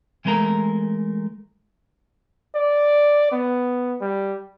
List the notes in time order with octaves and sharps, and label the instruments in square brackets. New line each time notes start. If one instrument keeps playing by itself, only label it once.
[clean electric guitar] E3 G#3 A3 A#4 A#5
[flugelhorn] D5
B3
G3